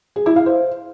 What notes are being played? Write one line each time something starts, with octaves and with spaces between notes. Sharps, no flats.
G#4
E4
F5
C5